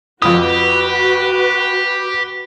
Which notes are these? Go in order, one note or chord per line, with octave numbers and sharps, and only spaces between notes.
F2 F#4 G4 B4 D#6